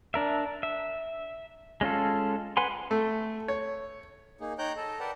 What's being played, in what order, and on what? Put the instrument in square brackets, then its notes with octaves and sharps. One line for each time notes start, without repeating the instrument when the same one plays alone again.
[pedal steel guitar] D4 A#4 E5
E5
G#3 C#4 F4 A4
B4 F#5 G#5 C6
[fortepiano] A3
C#5
[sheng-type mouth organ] A#3 D#4 G#4
D#4 C#5 G5 A#5 F#6 G6
A4 D#5 A5
A#4 B4 D5 F#5 G5 A5